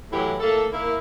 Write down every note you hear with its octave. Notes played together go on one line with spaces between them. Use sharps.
A2 E3 F#3 E4 G4
A2 A3 A#3 A4
A#3 E4